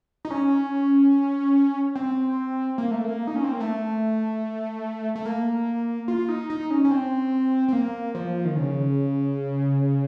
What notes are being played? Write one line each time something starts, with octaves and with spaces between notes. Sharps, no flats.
D#4
C#4
C4
A#3
A3
A#3
D#4
C#4
C4
A#3
A3
A3
A#3
F4
D#4
D#4
C#4
C#4
C4
C4
A#3
F3
D#3
C#3